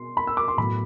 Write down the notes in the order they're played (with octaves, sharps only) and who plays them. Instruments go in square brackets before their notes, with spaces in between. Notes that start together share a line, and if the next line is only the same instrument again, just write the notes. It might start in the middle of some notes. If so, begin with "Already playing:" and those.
Already playing: [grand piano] B2 C6
B5
E6
D6
C6
A2 F#3 B3 B5